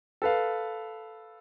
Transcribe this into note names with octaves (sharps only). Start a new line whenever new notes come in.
A4 B4 F5